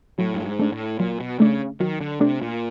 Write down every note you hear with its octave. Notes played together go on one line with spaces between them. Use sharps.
A2 F#3
G2
G#2
A3 D4
A2
A#2 F#3
B2
C#3 A3 D4
D#3 F#3
D3
C3 A3 D4
A#2